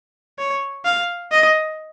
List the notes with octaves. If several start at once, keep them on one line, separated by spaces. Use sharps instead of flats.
C#5
F5
D#5